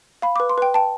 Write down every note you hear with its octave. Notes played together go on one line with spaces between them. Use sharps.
F5 B5
D6
B4
C6
B4 G5
G5 A5